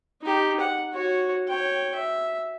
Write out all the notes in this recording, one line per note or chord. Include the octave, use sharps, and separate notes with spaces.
D#4 G4
F#5
F#4 C#5
C#5 G5
E5